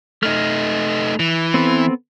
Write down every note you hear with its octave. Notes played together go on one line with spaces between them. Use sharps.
A3 D#4 F6
E3
B3 C4 A4